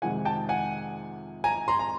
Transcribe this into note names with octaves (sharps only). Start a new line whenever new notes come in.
F2 C3 D#3 G#3 F#5 G#5
G5 A5
F#5 G#5
G#5 A#5
A#5 C6
A#5